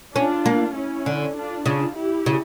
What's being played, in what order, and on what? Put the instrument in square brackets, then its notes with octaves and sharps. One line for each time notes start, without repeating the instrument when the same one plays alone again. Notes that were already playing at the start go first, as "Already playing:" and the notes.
[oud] C#4 [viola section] D4 F4
[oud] A#3
[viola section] C#4 E4
[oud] D3
[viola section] D4 F4
[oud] C#3 [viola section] D4 F4
[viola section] E4 G4
[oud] C#3